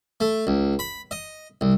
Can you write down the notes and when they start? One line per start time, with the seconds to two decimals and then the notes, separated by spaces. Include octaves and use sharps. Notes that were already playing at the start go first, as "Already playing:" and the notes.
0.20 A3
0.47 C#2
0.79 B5
1.11 D#5
1.61 C2